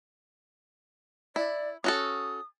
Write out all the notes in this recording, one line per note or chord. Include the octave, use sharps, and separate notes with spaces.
E4 D5
C#4 F#4 A4 D#6